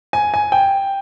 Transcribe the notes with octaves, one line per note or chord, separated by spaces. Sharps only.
G#5
G#5
G5